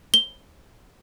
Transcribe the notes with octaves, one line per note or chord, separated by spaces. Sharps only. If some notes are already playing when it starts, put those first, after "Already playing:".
G7